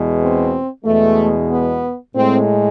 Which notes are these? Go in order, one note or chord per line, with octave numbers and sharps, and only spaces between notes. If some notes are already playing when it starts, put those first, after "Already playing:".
Already playing: E2 B2 G#3
C4
E2 B2 G#3 A3
B3
A2 G#3 C4